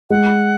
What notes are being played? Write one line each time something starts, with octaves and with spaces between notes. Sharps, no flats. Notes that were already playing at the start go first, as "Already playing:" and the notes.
G#3 F#5